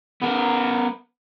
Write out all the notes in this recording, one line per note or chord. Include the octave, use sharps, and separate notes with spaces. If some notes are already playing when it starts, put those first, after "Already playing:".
B3 A#4